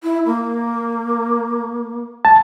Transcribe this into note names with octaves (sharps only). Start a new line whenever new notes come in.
E4
A#3
A5